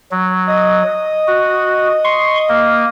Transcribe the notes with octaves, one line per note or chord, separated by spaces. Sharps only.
F#3
D#5
F#4
C6 C#6
A#3